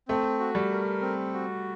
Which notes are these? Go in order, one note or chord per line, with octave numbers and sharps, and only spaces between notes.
A3 C4
F#4
G3
A#4
C4
F#4